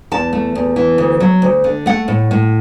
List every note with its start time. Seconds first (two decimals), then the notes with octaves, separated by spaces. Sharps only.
0.11 E2 A5
0.33 A3
0.55 E2
0.76 E3
0.98 D2
1.20 F#3
1.42 D2
1.64 D3
1.86 A3 F#5
2.08 A2
2.31 A2